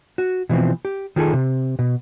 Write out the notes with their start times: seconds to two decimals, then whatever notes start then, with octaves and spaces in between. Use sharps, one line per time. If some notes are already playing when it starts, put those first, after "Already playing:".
0.18 F#4
0.49 B2 E3 F3 C4
0.85 G4
1.16 D#3 F4 G#4 A4
1.33 C3
1.79 B2